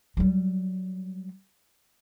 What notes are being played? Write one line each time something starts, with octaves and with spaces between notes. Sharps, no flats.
F#3 G3